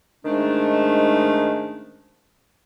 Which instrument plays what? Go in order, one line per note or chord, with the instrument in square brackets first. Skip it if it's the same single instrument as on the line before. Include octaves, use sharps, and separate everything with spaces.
[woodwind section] G#2 D#3 G#3 A3 C#4 D4